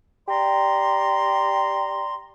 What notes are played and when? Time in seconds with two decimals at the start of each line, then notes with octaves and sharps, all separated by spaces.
0.29 G4 D5 A#5 C6